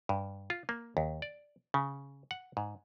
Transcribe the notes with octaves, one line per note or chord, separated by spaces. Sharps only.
G2
F4
A#3
D#2
D5
C#3
F#5
G#2